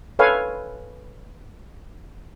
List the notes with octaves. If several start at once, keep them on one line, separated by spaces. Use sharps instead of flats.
A4 B4 C#5 F5 G#5